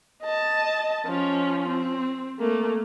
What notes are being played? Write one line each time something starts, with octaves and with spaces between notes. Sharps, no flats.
D#5 A5
F3 C#4
C4
A3 A#3